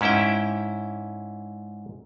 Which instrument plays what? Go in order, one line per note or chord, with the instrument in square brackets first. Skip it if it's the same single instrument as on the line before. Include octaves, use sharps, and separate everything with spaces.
[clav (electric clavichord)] G#2 C#4 E4 E5 G5